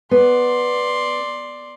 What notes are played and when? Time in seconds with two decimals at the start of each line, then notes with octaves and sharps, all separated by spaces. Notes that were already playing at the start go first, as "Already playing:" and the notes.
0.11 B3 D5 C6